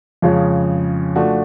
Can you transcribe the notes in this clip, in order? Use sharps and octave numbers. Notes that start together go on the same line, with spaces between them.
F2 C#3 F3 G#3 C#4
F3 A3 D4 F#4